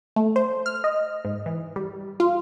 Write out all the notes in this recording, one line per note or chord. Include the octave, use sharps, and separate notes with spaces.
A3
C5
F6
D#5
G#2
E3
G3
F4